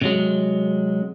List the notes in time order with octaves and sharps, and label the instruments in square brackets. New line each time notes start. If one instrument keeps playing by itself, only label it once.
[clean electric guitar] C3 F#3 G#3